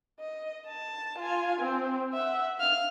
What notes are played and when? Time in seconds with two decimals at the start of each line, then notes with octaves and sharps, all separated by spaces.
0.20 D#5
0.67 A5
1.19 F4 G#5
1.61 C4
2.13 E5 F#5
2.59 F5 F6